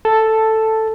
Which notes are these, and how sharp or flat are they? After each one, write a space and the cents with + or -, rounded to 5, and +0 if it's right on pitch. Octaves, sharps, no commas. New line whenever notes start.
A4 +5 A5 +0